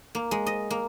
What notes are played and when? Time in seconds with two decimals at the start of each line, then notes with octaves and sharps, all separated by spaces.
0.15 A#3
0.31 G#3
0.46 D#5
0.70 A#3